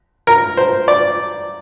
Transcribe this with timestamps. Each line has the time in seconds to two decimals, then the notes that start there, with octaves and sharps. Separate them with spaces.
0.27 A#4
0.57 C5
0.88 D5